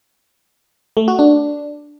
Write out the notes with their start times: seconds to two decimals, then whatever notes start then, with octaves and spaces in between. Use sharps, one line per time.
0.97 A3
1.08 F#4
1.19 D4